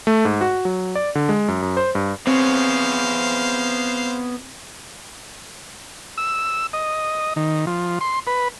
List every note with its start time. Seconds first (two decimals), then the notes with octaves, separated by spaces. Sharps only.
0.07 A3
0.25 G#2
0.41 F#4
0.65 F#3
0.95 D5
1.15 D3
1.29 G#3
1.48 F#2
1.62 F#2
1.77 C5
1.95 G2
2.27 B3 C4 G#4 C5 C#5 F5
6.18 E6
6.73 D#5
7.36 D#3
7.67 F3
8.01 C6
8.27 B4